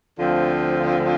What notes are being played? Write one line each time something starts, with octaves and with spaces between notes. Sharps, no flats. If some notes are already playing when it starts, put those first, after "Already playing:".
D2 D3 F3 C4 F4